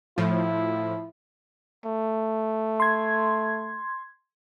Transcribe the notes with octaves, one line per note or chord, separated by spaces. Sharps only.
A2 F3 E4
A3
C6 G#6